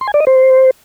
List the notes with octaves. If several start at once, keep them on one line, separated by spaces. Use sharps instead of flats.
C6
G#5
D5
D#5
C5